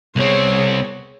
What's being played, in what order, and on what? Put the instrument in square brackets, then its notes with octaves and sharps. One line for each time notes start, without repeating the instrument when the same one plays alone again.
[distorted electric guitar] C2 C4 [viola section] B3 G#4 C#5